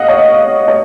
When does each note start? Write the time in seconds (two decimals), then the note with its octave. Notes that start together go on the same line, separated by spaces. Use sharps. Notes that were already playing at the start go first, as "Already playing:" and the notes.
Already playing: D#5 F5 F#5
0.08 C#5
0.68 C#5